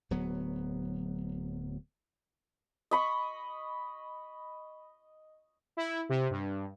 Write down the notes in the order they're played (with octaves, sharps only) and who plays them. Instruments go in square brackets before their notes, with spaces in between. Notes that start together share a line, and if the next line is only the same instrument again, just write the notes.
[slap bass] D1 F#3 B3
[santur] D#5 B5 C#6
[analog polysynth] E4
C3
G2